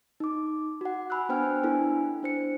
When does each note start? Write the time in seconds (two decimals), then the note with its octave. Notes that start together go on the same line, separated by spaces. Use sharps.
0.20 D#4 D6
0.81 F#4 F#5
1.10 G#5 B5 E6 F#6
1.29 B3 D4 C5 G5 G#5 F6
1.63 B3 D4 E4 A4 G#5
2.23 D4 C5 C#7